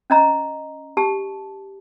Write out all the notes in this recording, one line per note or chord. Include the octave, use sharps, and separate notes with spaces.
C#4 D#5 A#5
G4 A5